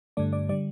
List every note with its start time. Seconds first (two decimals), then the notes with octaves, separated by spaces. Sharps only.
0.17 G2 D3 A3 D5
0.33 D5
0.49 D3 G3 D5